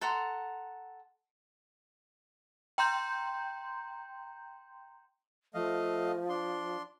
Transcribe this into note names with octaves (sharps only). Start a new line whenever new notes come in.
A4 F#5 A#5 C6
G5 A#5 C6 G6
F3 A3 D#5 F5
D4 C6